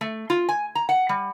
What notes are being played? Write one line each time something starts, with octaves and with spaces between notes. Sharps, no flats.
A3
F4
G#5
A#5
F#5
G3